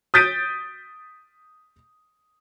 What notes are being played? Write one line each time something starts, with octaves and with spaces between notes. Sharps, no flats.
D#6 G6 A6 B6 D7 D#7